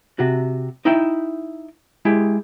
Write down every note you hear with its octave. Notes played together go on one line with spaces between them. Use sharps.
C3 F#4
D#4 E4 E5 G5
G#3 E4 G4